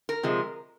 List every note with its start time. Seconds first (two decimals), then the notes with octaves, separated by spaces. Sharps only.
0.09 A#4
0.23 C3 F3 G#3